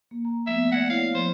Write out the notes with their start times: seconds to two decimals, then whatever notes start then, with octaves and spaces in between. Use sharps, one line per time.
0.11 A#3
0.25 A#5
0.47 F3 A3 B3 E5
0.72 D5 F#5 G#6 A#6
0.90 E4 C#5 F5
1.15 F3 C5